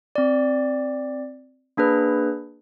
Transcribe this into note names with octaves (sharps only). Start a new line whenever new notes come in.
C4 D5
A#3 D4 G#4 B4